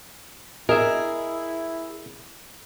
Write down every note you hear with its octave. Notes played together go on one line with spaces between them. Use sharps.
E4 G#4 A#4 D#5 E5